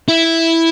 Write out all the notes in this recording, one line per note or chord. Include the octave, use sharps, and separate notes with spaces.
E4